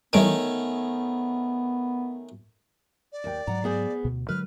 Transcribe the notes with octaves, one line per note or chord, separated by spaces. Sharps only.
D#3 E3 G3 A3 B3 C#4 D7
D5
D#2 G5
G#2 F#3 F#5 A#5
B3 G#4 C5
D2 B2
D3 F#3 G#3 B4 F6